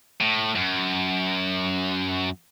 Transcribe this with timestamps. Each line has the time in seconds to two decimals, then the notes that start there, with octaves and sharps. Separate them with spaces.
0.21 A2
0.56 F#2